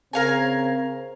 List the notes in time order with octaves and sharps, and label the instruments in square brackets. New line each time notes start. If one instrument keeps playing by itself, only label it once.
[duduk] C#3 [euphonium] C4 [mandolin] A#4 F5 G#5